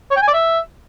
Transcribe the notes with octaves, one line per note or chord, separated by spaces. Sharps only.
C#5
G5
G#5
D5
E5